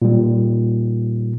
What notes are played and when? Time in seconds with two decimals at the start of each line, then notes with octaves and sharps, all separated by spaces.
0.02 A#2 G3